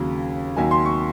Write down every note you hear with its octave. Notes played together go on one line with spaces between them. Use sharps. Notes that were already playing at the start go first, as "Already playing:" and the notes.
Already playing: D#2 C#3 F#3
D#2 D#3 F#3 G#5
C6
C#6